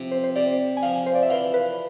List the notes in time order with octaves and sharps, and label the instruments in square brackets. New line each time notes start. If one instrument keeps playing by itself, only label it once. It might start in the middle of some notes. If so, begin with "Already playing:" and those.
Already playing: [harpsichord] C3 F3
[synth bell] C5
C5
[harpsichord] C3 [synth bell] D5
[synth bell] G#5
[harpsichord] F3 [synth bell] F5
[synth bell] C5
D5
E5
[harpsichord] E3 [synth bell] F5
[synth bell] B4